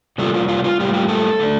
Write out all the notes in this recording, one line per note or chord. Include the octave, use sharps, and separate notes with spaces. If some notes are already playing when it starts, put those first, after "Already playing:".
C3 G3 A#3 F4 A4
F4
F4
F4
A2 G3 A#3 D4 F4 G4
G4
A4
D3 A3 D4